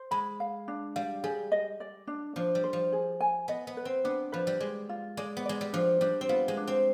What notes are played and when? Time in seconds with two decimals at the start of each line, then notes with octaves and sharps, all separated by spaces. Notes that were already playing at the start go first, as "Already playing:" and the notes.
Already playing: C5
0.11 G#3 B5
0.40 F5
0.68 D4
0.96 G3 F5
1.23 G3 G#4
1.52 D#5
1.80 D5
2.07 D4
2.36 F3 D4
2.55 G3
2.64 C5
2.73 F3
2.92 G#4
3.20 G#5
3.48 B3 D#5
3.67 B3
3.77 B4
3.85 C4
4.04 B3 D4
4.32 F3 B4
4.47 G3
4.60 G#3 D5
4.89 F4
5.17 G#3 D5
5.37 B3
5.45 G#3 D5
5.61 G3
5.73 F3 D4
6.01 G3 D4
6.21 C4
6.29 B3 F4
6.48 G#3
6.57 D4
6.67 C4